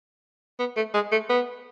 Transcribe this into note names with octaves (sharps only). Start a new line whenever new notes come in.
B3
A3
G#3
A3
B3